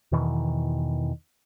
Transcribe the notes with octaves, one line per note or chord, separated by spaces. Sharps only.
E2 B2 D#3 E3